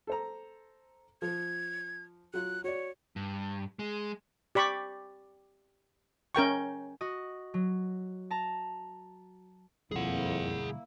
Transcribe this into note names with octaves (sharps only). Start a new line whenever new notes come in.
A4 C5 A#5
F3 G#6
F#3 F4 F#6
F#4 C#5 D5
G2
G#3
G4 D5 B5 C#6
C#4 A#4 G5 C#6
F#4 D#5
F#3
A5 A#5
F2 B2 D3 G3 A#3 E4 G#4 F#5